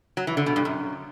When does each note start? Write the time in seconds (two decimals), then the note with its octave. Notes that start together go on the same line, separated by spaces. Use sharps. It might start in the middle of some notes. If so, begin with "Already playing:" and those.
0.17 F#3
0.27 E3
0.37 D3
0.46 B2
0.56 G2
0.65 F#2